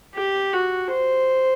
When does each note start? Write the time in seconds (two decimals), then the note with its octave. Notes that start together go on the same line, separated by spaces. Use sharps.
0.15 G4
0.53 F#4
0.91 C5